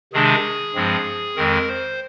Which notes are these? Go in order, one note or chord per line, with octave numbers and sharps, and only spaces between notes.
C3 D#3 G#3 D4 G#4
G2 F3 G#3 C4
F2 D#3 G#3 C4 A#4
C5